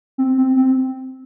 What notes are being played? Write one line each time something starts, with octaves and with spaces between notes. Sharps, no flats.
C4
C4
C4